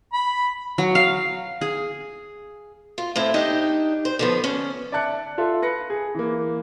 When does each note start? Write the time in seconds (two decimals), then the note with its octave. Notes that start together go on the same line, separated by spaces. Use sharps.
0.13 B5
0.78 F#3
0.95 F5
1.61 G#4
2.98 F4
3.16 A2 C4 E4
3.34 D4 D#4 G4 D#5
4.05 C5
4.19 D3 F3 B3
4.44 C#4
4.92 D5 E5 A5 F#6 C#7
5.38 F4 A4 E5
5.62 B4 A#6 C#7
5.90 G#4
6.15 E3 A#3